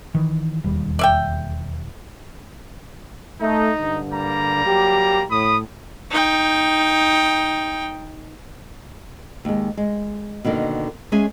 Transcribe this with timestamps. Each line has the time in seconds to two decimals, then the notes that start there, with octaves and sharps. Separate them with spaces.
0.15 D#3 E3
0.64 E1 D#2 G3
0.99 D5 E5 G5
3.41 A3 D#4
3.80 G2 D3
4.12 G3 A#3 A#5
4.66 F#3 G4
5.30 A2 B5 D#6
6.11 D#4 G5
9.45 D#2 G#3
9.77 G#3
10.45 B2 D3 D#3 A#3
11.12 G#3 C#4 G#4 E5 G#5